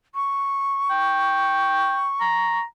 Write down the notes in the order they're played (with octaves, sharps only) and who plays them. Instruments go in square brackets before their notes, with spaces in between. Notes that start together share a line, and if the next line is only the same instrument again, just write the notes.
[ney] C#6
[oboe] G5
A#5